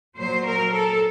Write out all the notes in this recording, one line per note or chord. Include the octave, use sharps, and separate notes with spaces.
A#2 F#3 C5
A#4
A4